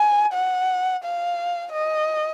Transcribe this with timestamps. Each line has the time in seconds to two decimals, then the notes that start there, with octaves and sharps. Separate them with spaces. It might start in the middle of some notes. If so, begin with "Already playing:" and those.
Already playing: G#5
0.33 F#5
1.04 F5
1.73 D#5